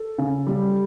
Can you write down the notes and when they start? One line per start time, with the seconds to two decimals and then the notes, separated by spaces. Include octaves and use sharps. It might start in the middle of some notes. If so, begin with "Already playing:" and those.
Already playing: A4
0.18 C#3
0.47 G3